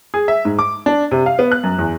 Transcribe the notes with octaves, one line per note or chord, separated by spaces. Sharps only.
G#4
E5
G#2
D6
D4
C3
F5
B3
F#6
F#2
E2